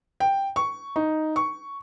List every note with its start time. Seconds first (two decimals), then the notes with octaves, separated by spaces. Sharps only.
0.20 G5
0.56 C#6
0.96 D#4
1.36 C#6